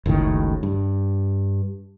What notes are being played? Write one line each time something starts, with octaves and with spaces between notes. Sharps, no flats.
F#1 C#2 A2 D#3
G2